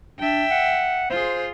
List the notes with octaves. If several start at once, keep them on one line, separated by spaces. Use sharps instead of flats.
D4 E5 G5
F#5
F4 G#4 C5